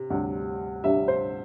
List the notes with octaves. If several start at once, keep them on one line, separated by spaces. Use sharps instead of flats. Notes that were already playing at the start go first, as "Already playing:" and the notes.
Already playing: C3
D2 C3 G3
D2 C3 G3 E5
C5